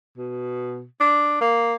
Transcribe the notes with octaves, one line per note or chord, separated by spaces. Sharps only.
B2
D4
A#3